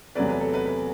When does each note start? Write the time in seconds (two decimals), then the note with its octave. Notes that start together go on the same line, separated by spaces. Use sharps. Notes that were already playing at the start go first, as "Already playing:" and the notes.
0.15 E2 C3 F#3 A3 B4 D5
0.29 B4
0.41 A4
0.54 B4
0.66 B4